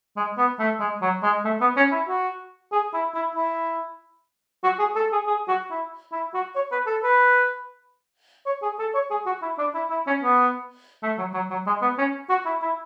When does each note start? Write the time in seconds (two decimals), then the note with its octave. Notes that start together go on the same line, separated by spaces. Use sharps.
0.17 G#3
0.38 B3
0.59 A3
0.80 G#3
1.02 F#3
1.23 G#3
1.45 A3
1.61 B3
1.77 C#4
1.92 E4
2.08 F#4
2.72 G#4
2.94 E4
3.14 E4
3.35 E4
4.64 F#4
4.79 G#4
4.96 A4
5.12 G#4
5.27 G#4
5.48 F#4
5.71 E4
6.12 E4
6.34 F#4
6.55 C#5
6.72 B4
6.87 A4
7.03 B4
8.46 C#5
8.62 G#4
8.79 A4
8.94 C#5
9.11 G#4
9.26 F#4
9.42 E4
9.58 D4
9.75 E4
9.90 E4
10.07 C#4
10.23 B3
11.03 A3
11.18 F#3
11.34 F#3
11.50 F#3
11.67 G#3
11.82 B3
11.98 C#4
12.29 F#4
12.46 E4
12.62 E4